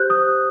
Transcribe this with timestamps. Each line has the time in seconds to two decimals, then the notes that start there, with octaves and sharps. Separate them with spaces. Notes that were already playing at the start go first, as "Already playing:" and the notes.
Already playing: G4 C5 F#6 G6
0.10 D#6